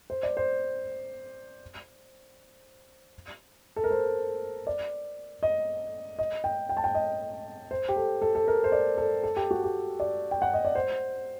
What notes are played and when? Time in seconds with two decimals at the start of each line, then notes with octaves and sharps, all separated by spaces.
0.10 C5
0.23 D5
0.37 C5
3.76 A4
3.84 A#4
3.91 C5
4.67 D5
5.43 D#5
6.19 D#5
6.44 G5
6.69 G5
6.77 A5
6.84 G5
6.95 D#5
7.71 C5
7.89 G4
7.96 A4
8.22 A4
8.35 A4
8.48 A#4
8.64 C5
8.72 D5
8.98 A4
9.24 A4
9.36 G4
9.51 F#4
9.64 G4
10.00 D5
10.31 G5
10.42 F#5
10.54 D#5
10.65 D5
10.75 C5